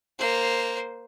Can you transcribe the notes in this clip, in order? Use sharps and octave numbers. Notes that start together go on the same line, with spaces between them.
A#3 C5